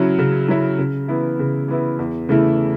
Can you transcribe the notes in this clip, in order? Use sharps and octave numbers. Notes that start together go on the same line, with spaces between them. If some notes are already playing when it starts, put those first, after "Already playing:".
Already playing: C#3 F#3 C#4 E4
C#3
F#3 C#4 E4
C#3
E3 B3 E4
C#3
E3 B3 E4
E2
C#3 E3 A3 E4